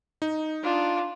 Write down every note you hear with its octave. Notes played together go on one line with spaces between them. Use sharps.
D#4
D4 F4